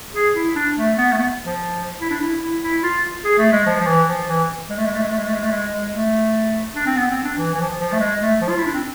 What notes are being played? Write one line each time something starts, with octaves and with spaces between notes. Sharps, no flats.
G#4
E4
D4
A3
B3
A3
B3
F3
E4
D4
E4
E4
E4
F4
G#4
A3
G#3
F3
F3
E3
F3
E3
G#3
A3
G#3
A3
G#3
A3
G#3
A3
G#3
A3
G#3
G#3
A3
D4
C4
B3
C4
D4
E3
E3
F3
F3
A3
G#3
A3
F3
F4
E4
D4
C4